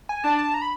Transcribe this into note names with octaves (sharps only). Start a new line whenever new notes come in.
G#5
D4 A5
A5
A#5
B5